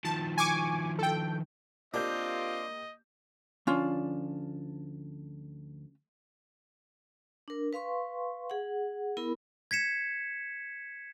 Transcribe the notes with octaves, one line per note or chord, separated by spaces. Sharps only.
D#3 F3 A5
G#5 C#6 D6
A4 G5
A#3 C4 D4 F4 G4 D#5 G6
D2 F3 C#4 D4 F4
D4 A#4
B4 F5 C6 C#6
G#4 F#5
B3 E4 A#4 B5
G#6 B6 C#7 E7